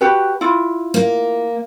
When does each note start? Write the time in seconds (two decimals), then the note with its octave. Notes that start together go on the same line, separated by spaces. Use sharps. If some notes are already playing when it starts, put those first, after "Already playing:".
0.01 F#4 G4 B4
0.41 E4 F4
0.94 A#3